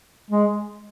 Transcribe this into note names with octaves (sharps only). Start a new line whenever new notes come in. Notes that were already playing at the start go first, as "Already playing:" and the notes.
G#3